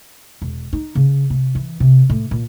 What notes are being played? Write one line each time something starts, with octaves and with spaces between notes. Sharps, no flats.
E1
D#4
C#3
C3
E3
C3
A2
A#2